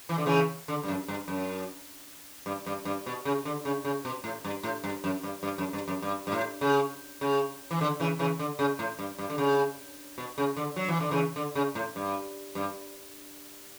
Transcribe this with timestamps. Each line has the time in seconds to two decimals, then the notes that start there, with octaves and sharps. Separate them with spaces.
0.09 E3
0.18 D3
0.26 C#3 E3
0.68 D3
0.83 G2
0.88 F#2
1.08 G2
1.28 F#2
2.46 G2
2.66 G2
2.85 G2
3.06 B2
3.25 C#3
3.45 D3
3.65 C#3
3.85 C#3
4.05 B2
4.24 A2
4.44 G2
4.63 A2
4.84 G2
5.04 F#2
5.23 G2
5.43 G2
5.58 F#2
5.73 G2
5.88 F#2
6.02 G2
6.27 G2
6.32 A2
6.61 C#3
7.21 C#3
7.71 E3
7.81 D3
8.00 C#3 E3
8.19 C#3 E3
8.39 D3
8.59 C#3
8.79 A2
8.99 G2
9.18 G2
9.30 D3
9.38 C#3
10.18 B2
10.38 C#3
10.57 D3
10.76 F#3
10.88 E3
11.00 D3
11.11 C#3 E3
11.36 D3
11.55 C#3
11.75 A2
11.96 G2
12.55 G2